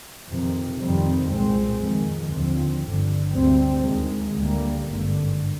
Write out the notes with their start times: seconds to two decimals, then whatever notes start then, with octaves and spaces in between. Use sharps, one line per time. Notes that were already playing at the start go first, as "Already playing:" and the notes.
0.27 F2 C3 D#3
0.78 F2 C3 D#3 G3 C4
1.29 C2 A#2 G#3 C4
1.80 F2 D#3 G#3
2.30 D#2 D3 F3 C4
2.82 G1 G2 D3
3.33 D2 C3 G3 C4
3.84 D#2 D#3 G#3
4.34 D2 D3 G3 A#3
4.86 G#1 G2 D3